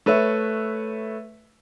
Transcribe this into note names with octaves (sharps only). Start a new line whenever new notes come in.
A3 B4 C#5 E5